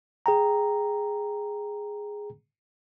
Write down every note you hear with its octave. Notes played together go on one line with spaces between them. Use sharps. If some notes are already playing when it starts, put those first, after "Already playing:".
G#4 G5 A#5